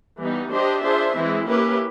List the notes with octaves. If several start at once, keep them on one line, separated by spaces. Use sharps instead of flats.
E3 G3 B3 D#4
D4 G4 C5 D#5
D4 F4 G#4 C5 E5
E3 G#3 C4 E4
A#3 C#4 E4 G4 B4